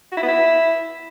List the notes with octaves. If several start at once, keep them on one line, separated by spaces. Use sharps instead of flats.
F#4
E4
B3
E4